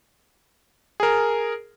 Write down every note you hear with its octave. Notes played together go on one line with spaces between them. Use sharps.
G#4 A#4